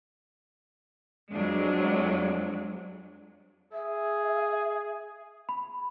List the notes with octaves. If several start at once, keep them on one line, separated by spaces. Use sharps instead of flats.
F2 F#3 G#3 D4
G#4 E5
B5